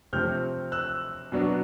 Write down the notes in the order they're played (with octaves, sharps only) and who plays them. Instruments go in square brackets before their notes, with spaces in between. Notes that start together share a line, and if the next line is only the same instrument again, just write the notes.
[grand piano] C3 F3 A3 C4 F6 G6
E6 F#6
B2 F#3 B3 D4